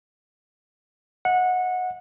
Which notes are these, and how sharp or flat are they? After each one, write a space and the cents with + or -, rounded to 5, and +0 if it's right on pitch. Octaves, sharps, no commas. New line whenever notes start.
D#5 +25 F#5 -20